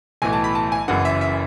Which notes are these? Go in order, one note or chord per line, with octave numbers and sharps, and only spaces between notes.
B1 A2 E3 G#5
A5
B5
A5
G#5
F#1 F#2 C#3 E3 F#5
E5
E5